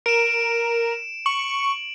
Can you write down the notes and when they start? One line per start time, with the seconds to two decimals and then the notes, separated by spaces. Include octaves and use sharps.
0.06 A#4 D7 E7
1.26 C#6 F#7